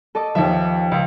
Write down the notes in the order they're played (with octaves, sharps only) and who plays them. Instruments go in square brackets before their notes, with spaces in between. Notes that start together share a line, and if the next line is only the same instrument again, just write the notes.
[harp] A4 D#5 D6
[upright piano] D#2 E5 [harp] F3
[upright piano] C#2